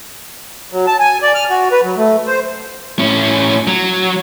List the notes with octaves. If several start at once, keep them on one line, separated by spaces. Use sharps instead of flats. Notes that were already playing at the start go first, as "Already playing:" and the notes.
F#3
A5
G#5
D5
F6
F#4
B4
F#3
A3
C5
A2 C#4
F#3